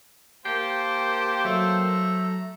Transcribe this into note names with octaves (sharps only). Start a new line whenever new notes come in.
A#3 G4 C5 G5 A5 G6 C7
F#3 A3
A#5